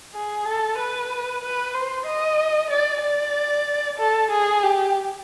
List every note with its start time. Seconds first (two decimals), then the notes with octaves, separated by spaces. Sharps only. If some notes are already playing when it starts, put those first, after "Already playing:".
0.14 G#4
0.45 A4
0.78 B4
1.42 B4
1.74 C5
2.06 D#5
2.70 D5
3.02 D5
3.99 A4
4.31 G#4
4.63 G4